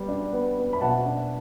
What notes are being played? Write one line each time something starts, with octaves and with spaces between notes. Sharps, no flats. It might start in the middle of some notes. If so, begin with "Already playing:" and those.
Already playing: G3 B3
D4
B3
B3
B5
B2 F#5 A5
D4